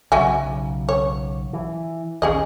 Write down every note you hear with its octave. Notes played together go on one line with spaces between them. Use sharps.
B1 C#3 F#3 F#4 E5 G#5
C#5
E3
A#1 D#2 C#4 G#4 D#5